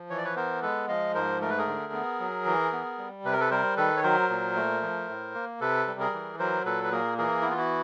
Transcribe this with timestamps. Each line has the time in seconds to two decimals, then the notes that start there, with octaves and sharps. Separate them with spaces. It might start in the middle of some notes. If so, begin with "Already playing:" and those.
Already playing: F3
0.10 E3 C#5
0.18 D5
0.24 B4 C#5
0.36 B3 A#4 C5
0.62 G#3 A4 B4
0.88 F3 D#5 F5
1.14 G#2 A#4 C5
1.41 A3 A#4
1.50 B4
1.58 G#4 A#4
1.68 D3
1.93 B3
2.20 F#3
2.46 E3
2.73 B3
2.98 G3
3.24 C3 B4
3.33 A#4
3.40 A4 B4
3.51 G3 A#4 C5
3.77 D#3 A4 B4
3.97 C#5
4.03 F#3 A#4 C5
4.30 A#2
4.56 A3
4.82 F3
5.09 A2
5.35 A#3
5.61 C3 A4 B4
5.87 G3
6.00 G#4 A#4
6.13 E3
6.39 F#3 A#4 C5
6.65 A#2 A4 B4
6.83 B4
6.91 A#3 G#4 A#4
7.18 E3 G#4 A#4
7.41 E4
7.45 B3
7.50 F4
7.57 E4 F#4